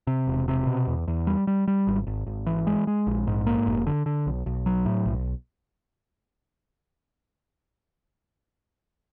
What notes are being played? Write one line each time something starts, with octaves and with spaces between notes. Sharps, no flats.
C3
E1
C3
B2
E2
E2
G3
G3
G3
G#1
G#1
G#1
E3
G#3
G#3
A#1
G#2
A#3
F1
D3
D3
B1
B1
F#3
A2
B1